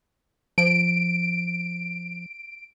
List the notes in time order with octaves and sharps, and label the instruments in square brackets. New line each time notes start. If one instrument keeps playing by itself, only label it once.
[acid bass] F3 [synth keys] D7